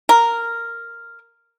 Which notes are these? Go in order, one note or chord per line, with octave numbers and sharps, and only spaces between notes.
A#4